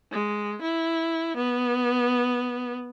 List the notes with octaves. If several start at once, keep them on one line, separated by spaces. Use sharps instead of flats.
G#3
E4
B3